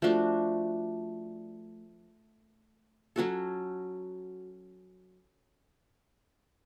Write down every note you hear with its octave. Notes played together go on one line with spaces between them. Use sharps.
F3 A3 D4 F#4
F#3 C#4 F#4 A4